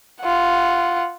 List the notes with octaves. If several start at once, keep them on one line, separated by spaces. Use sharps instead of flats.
F4 F#5